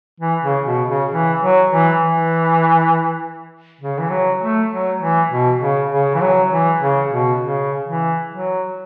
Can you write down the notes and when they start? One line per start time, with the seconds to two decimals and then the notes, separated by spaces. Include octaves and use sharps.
0.20 E3
0.44 C#3
0.66 B2
0.88 C#3
1.11 E3
1.41 F#3
1.71 E3
2.00 E3
3.81 C#3
3.99 E3
4.10 F#3
4.41 A3
4.71 F#3
5.01 E3
5.30 B2
5.60 C#3
5.90 C#3
6.16 E3
6.21 F#3
6.51 E3
6.80 C#3
7.11 B2
7.40 C#3
7.86 E3
8.30 F#3